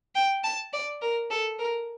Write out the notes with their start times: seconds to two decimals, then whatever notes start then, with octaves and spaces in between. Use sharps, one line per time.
0.15 G5
0.44 A5
0.73 D5
1.02 A#4
1.30 A4
1.59 A#4